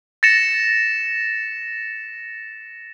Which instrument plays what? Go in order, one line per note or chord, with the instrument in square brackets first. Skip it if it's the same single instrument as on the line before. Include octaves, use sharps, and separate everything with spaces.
[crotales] A6 A#6 C#7 E7